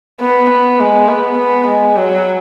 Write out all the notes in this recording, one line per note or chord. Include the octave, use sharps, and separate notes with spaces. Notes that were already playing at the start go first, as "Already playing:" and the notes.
B3
B3
G#3
B3
B3
G#3
F#3